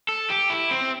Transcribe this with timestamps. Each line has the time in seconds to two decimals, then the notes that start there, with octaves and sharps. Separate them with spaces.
0.09 A4
0.30 G4
0.50 E4
0.71 C4